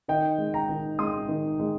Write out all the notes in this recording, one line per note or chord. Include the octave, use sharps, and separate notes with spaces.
D#3 D#5 G5
G#3
G5 A#5
D#3
G#3 C6 D#6
D#3
G#3